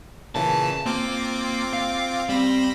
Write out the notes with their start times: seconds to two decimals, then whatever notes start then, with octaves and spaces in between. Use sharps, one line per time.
0.35 A#2 C#3 E3 A5
0.86 A#3 C4 F4 D6
1.73 F5
2.29 G3 C4 B5 A#6